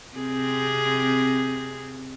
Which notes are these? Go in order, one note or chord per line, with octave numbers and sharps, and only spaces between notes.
C3 C4 G#4